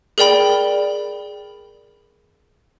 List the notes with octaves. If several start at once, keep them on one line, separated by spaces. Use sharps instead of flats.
G#4 A#4 D5 G5 B5